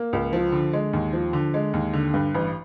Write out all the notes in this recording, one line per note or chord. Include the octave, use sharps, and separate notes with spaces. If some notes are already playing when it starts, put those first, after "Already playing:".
Already playing: A#3
C#2
F3
D3
G#3
D#2
F3
D3
G#3
D#2
D3
G2
A1